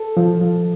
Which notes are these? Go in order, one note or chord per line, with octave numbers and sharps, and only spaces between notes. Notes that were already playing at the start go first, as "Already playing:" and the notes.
Already playing: A4
F3
F3